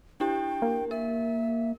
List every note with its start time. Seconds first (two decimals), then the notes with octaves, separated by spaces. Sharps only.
0.20 D4 E4 G4 G5
0.62 A#3
0.91 A#4 E5